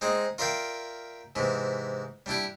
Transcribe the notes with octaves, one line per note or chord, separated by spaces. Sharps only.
G#3 C4 D#4 G#4
F4 A#4 D5 E5 F5 G5
G#2 C3 E3
G3 D4 E4 G4